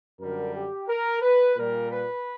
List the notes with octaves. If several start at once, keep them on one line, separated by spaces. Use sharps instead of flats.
F#2 D3 G3 A#4
G4
A#4
B4
A#2 G3 A#4
B4